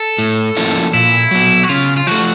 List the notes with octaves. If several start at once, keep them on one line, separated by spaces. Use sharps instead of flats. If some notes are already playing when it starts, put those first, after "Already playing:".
Already playing: A4
A2
F3 A#3 C#4 E4
A#2 E4
F#3 B3
F#4
C#3 F4
F4
F3 A3 F#4